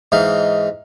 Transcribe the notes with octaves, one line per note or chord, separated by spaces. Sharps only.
G#2 E3 D#4 F5